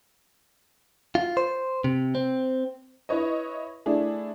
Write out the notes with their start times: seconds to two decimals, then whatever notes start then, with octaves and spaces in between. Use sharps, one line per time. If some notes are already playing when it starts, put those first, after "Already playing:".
1.15 F4
1.37 C5
1.84 C3
2.15 C4
3.09 E4 B4 C#5 D#5
3.86 A3 D4 E4 G#4